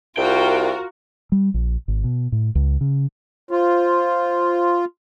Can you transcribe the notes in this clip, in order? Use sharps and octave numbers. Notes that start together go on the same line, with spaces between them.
C2 F4 F#4 A#4 G5
G3
A#1
G#1
B2
A2
C#2
C#3
F4 C5